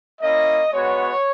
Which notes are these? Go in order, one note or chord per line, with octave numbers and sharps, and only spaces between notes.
A#3 C#4 E4 D#5
G#3 B3 F#4 C#5